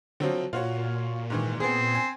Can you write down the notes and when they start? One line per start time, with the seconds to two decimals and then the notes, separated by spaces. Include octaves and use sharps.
0.20 D3 F3 F#3 C4
0.53 A#2 F4 F#4 C#5
1.30 G#2 D#3 E3
1.60 B3 C4 G#4
1.95 G#5